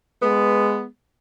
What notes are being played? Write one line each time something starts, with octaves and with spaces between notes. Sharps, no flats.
G#3 B3